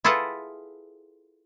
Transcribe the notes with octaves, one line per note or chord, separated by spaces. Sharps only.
E4 F4 G#4 A4 B4 F#5